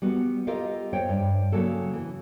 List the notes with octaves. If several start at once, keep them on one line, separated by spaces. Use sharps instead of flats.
G3 B3 F#4
F4 G4 A4 A#4 D#5 F5
C5 C#5 G5
G2
C#3 F#3 A#3 A4
E3